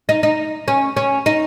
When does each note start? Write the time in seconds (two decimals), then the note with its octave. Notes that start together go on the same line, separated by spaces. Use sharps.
0.09 D#4
0.23 D#4
0.68 C#4
0.97 C#4
1.26 D#4